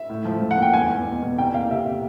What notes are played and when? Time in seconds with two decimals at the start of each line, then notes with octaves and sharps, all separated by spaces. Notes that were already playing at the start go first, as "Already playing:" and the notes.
Already playing: E5
0.09 A2
0.25 F3
0.41 F3
0.51 F#5
0.57 A#3 G5
0.74 E2 G#5
0.90 E2
1.06 B2
1.23 E2
1.38 C2 G5
1.54 A#3 F5
1.70 C3 E5
1.87 C3